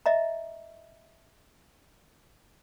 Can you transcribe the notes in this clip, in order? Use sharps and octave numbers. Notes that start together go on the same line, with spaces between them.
D#5 E5 A#5